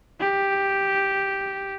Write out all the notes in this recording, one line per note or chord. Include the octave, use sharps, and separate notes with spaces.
G4